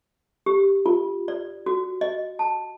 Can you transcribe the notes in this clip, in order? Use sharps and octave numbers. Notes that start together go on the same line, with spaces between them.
G4
F4
D5
F#4
D#5
A5